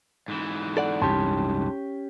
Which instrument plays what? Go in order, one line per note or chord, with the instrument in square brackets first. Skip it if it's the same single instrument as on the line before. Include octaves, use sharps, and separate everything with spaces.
[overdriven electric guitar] G#2 E3
[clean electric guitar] A4 D5 F#5
[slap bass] C2 F#2 [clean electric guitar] C#4 G4 [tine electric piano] A5 C6